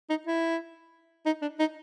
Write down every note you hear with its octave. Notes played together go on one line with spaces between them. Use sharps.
D#4
E4
D#4
D4
D#4